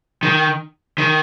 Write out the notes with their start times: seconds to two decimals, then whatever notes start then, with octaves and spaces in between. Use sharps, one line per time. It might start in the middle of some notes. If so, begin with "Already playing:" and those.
0.23 D#3
0.98 D#3